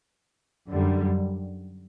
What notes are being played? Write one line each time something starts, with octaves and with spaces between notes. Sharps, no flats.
F#2 D3 G3